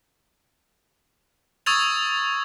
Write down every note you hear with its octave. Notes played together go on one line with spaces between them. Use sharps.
C#6 D#6 E6 G#6 A6 F7